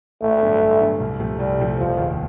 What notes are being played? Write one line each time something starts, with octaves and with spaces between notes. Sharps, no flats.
A1 A3
G2 D3 F#3 B3
A1
G2 D3 F#3 B3
C2
C3 F3 A3
C2 G3
C3 F3 A3
F1 F3
D#2 D#3 G#3